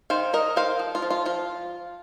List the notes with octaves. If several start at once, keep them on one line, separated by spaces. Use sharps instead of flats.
D#3 C5 F5
D#4 A#4 D#5
D#3 C5 F5
F3
F4
F3
F4
F3 F4